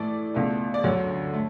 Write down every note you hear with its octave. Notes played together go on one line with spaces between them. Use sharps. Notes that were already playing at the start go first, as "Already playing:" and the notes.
Already playing: A2 E3 A3 D5
C#2 B2 A3
D5
D2 D3 F#3 C#5
A3